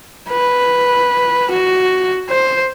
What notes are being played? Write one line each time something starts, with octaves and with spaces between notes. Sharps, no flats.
B4
F#4
C5